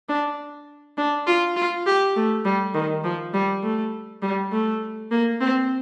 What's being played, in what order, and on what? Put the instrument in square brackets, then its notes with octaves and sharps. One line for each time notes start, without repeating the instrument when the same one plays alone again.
[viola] D4
D4
F4
F4
G4
A3
G3
D#3
F3
G3
A3
G3
A3
A#3
C4